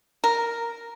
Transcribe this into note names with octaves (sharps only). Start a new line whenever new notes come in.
A#4